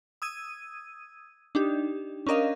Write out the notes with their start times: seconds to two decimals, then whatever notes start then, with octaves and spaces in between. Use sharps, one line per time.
0.22 D#6 E6 G#6 D#7
1.55 D4 D#4 G4
2.27 C#4 D4 A#4 D#5 F5